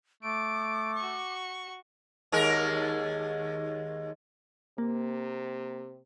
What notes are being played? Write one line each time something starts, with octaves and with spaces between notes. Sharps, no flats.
A3 D6 D7
F#4 C#6
D#2 G#3 A#4
C3 A#3